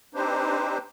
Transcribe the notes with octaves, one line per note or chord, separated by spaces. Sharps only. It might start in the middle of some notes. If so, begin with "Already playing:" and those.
C4 D4 D#4 G4 B4 C5